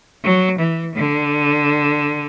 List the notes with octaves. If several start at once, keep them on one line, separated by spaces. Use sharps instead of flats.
F#3
E3
D3